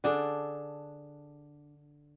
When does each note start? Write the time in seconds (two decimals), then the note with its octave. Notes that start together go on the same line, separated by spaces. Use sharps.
0.04 D3 D4 G#4 A4